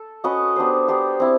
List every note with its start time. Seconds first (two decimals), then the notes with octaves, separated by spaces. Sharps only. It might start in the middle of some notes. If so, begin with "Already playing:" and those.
Already playing: A4
0.24 C#4 F#4 B4 D#5
0.56 B3 D4 G4 C5
0.88 B3 D4 G4 C5
1.20 C4 E4